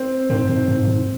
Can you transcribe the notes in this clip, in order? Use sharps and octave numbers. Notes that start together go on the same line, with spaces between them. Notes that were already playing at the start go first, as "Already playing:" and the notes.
Already playing: C4
G#2 C4
G#2
G#2
G#2